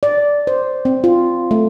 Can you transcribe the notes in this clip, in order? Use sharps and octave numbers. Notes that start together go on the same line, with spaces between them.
D5
C5
C4
F4
A3